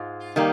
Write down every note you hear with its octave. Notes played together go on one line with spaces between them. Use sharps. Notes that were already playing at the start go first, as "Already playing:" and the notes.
Already playing: G#2 G#3 F4
D#3 G3 A#3